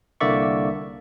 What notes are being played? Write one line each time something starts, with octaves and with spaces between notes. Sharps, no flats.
C2 D3 A#3 D5 E5 C#6